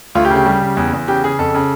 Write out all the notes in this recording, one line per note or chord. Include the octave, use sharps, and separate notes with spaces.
D2 F4
G4
C#3
G4
G3
C#3
E2
E2
C#3 G4
C#3 G#4
F2 A4
C#3